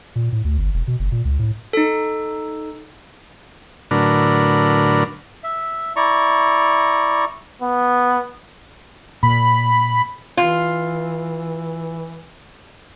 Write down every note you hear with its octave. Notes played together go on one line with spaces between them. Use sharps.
A#2
A2
D2
G1
E1
B2
F#1
A#2
C#2
A2
D#4 A4
A2 D3 F#3 D4 A#4 B4
E5
E4 D5 A#5 C#6
B3
A#2 B5
E3 F4